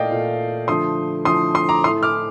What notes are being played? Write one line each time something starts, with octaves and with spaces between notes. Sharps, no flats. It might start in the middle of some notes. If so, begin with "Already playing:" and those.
Already playing: A#2 A3 D5 D#5 F5 G5
A#2 A3
D3 F3 A3 C6 D#6
D3 F3 A3 C6 D#6
C6 D#6
A#5 D6
A2 A3 C6 D#6
D6 F6